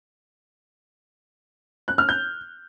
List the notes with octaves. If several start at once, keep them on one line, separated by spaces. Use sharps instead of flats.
F#6
F6
G6